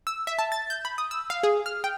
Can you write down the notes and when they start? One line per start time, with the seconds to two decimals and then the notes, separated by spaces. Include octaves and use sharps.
0.07 E6
0.27 E5
0.39 A5
0.52 A6
0.70 G6
0.85 B5
0.98 D#6
1.11 E6
1.30 F5
1.43 G#4
1.66 F6
1.84 G5